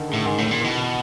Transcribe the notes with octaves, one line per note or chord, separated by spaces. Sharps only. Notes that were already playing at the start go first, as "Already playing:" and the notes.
Already playing: D3 D#3
C#3
A2
G#2 D#3
A2 D#3
A#2
B2 E3
D#3
E3